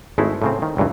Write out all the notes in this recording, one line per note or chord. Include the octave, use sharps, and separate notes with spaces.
G#1 G#3 A3 E4
A2 C#3 C4
D#3
C#2 G2 A#2 E3